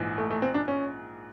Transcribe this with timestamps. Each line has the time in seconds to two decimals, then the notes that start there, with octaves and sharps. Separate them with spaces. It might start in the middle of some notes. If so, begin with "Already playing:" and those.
Already playing: A#1 G#2 E3
0.18 A3
0.30 A3
0.42 C4
0.54 D4
0.68 C#4